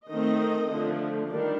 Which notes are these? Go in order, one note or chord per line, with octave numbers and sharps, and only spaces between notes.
D#3 A3 C4 D#5
D3 F3 A3
D#3 G3 D4